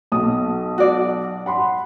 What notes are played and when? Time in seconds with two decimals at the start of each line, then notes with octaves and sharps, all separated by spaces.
0.12 B1 D#6
0.78 F#4 D5
1.46 F#5 B5 C6